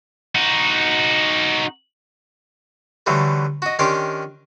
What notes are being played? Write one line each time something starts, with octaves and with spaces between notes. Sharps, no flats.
D#4 F#4
D3 E3 F#3 G3 A3
F#4 D#5
D#3 C#4 D4 G4 C6 D6